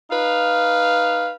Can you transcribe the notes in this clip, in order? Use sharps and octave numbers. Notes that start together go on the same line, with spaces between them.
D#4 B4 F5